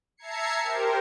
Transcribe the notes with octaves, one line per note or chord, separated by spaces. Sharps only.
E5 A5 A#5 G#6 C7 C#7
G4 A#4 C5